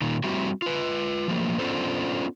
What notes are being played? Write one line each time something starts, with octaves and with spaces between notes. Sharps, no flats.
A#2 D#3
G3 C4 E4 F#4 G4
F4 B4
F3 F#3 A3 A#3
B3 C#4 D4 F4 A4 C5